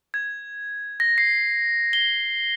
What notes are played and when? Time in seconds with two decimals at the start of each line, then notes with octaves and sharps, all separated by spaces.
0.14 G#6
1.00 A#6
1.18 C7
1.93 G7